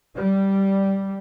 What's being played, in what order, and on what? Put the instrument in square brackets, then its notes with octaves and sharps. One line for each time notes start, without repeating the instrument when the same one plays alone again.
[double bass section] G3